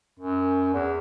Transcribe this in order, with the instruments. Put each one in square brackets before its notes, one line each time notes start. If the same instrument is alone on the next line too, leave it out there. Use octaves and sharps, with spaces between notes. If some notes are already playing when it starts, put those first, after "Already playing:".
[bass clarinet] F#2
E2